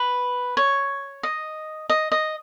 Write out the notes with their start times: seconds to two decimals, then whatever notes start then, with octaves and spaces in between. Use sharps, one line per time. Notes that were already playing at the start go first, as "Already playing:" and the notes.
Already playing: B4
0.57 C#5
1.23 D#5
1.90 D#5
2.12 D#5